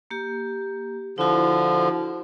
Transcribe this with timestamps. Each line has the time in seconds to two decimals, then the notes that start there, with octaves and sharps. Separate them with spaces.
0.11 A#3 G4
1.18 D3 F3 E4 F#4